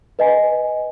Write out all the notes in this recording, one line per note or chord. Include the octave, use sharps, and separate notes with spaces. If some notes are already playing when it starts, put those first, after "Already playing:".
B4 D#5 G#5